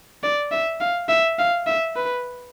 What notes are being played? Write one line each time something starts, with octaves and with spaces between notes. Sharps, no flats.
D5
E5
F5
E5
F5
E5
B4